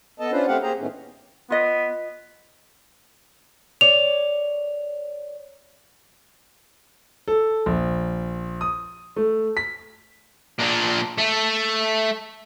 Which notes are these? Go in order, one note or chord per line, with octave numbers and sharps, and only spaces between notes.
B3 A4 D#5 A5
C#4 D4 F4 B4 C5
A3 C4 G4 F5 F#5
A#3 G4 G#4 C5 A#5
A2 D#3 A3 B3 C#4
B3 F4 D#5
C#5 D5 F7
A4
A#1
D#6
A3
B6
A#2 D4
A3